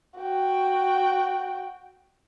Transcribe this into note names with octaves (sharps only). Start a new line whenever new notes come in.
F#4 G5